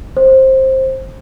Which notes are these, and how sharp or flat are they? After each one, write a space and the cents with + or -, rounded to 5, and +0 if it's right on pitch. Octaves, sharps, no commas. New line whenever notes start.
C5 +15